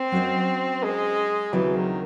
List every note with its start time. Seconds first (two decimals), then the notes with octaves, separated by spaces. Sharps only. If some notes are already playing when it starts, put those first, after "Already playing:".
Already playing: C4
0.12 F#3 C#4 G#4 C5 D#5
0.83 G#3
1.53 D#2 C#3 E3 F#3 C4 F#4
1.76 D#3